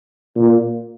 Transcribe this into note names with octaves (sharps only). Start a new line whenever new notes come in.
A#2